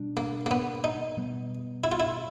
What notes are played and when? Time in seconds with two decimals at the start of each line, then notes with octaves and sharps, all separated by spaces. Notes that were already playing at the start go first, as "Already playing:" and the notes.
Already playing: B2 G3 D4
0.17 A#3
0.46 A#3
0.51 B3
0.84 D#4
1.17 B2 G3 B3
1.84 E4
1.92 F4
2.00 E4